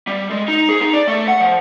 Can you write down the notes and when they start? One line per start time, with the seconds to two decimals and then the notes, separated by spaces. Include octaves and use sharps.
0.07 G3
0.30 G#3
0.48 D#4
0.69 G#4
0.81 D#4
0.93 D5
1.08 A3
1.28 F#5
1.41 F3